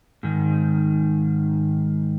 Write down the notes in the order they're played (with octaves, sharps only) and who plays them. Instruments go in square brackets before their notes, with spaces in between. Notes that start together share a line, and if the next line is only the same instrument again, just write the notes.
[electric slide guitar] G#2 D#3